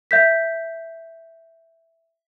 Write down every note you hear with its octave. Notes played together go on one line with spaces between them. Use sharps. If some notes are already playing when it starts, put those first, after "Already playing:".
E5 G6 B6